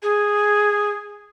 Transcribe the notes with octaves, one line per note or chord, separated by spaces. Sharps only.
G#4